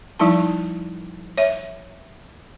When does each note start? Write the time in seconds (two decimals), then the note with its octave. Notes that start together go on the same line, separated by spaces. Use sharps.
0.19 F3 G3 D#4 E4 A5
1.37 C#5 E5